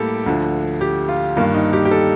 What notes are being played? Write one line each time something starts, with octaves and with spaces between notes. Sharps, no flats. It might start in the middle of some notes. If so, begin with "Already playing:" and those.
Already playing: A2 G3 A#3 G4 A4
D2 D3 F3
G4
F4
G2 D#3 A#3 F4
D#4
G4
G4
A4